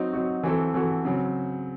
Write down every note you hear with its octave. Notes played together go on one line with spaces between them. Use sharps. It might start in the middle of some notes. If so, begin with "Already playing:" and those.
Already playing: F#3 C4 D#4 F#4
F#3 C4 D#4 F#4
E3 C4 F#4 A4
E3 C4 F#4 A4
C#3 F#3 C4